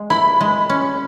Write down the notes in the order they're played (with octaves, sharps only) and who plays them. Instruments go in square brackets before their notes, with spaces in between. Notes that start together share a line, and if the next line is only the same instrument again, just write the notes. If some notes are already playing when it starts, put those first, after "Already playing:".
Already playing: [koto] G#3
[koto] E4 [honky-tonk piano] B5
[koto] G#3
C#4